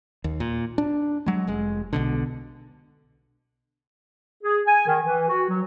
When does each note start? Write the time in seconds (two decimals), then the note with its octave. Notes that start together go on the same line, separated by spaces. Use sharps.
0.24 D#2
0.40 A#2
0.78 D4
1.26 F#3 G#3
1.47 F1 G#3
1.93 B1 B2 D3
4.43 G#4
4.67 G#5
4.87 D#3
5.05 E3
5.28 F#4
5.49 F#3